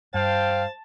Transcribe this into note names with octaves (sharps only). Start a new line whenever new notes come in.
G2 C5 F5 G5 A5